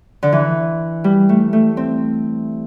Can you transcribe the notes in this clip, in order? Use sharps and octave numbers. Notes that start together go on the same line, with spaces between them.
D3
E3
G3
A3
A3
C4